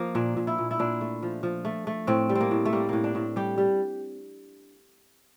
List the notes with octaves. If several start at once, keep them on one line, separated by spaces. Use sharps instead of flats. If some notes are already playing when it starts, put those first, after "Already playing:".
Already playing: F3 A#3
A#2 D4
A#2
E4
A#2
E4
A#2 D4
A3
F3
F3
A3
A3
A2 C4
G3
C4
A#3
A2
A3
G3 A#3
A2 A#3
D4
A2
G3 G4
G3